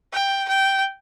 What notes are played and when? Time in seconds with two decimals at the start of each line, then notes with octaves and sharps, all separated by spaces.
0.13 G5
0.49 G5